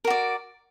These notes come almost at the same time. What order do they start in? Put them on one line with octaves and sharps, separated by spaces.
A#4 F#4 D5